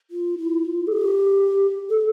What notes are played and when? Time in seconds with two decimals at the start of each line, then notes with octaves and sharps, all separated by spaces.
0.11 F4
0.38 E4
0.65 F4
0.87 A4
0.92 G4
1.90 A4